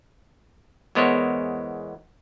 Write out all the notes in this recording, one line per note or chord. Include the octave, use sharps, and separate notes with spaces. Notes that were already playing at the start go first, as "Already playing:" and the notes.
E2 G#3 B3 A#4 C5 C#5